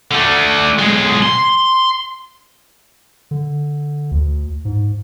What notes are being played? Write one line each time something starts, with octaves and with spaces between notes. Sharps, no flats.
D3 A3
B1 G#3
C6
D3
D2
G#2